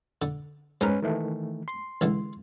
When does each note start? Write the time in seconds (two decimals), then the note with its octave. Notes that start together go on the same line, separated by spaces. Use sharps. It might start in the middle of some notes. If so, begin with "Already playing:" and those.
0.22 D3
0.81 G#2 C#4 A#4 B4
1.02 D#3 E3 A3
1.68 C6
2.01 C#2 D3 E3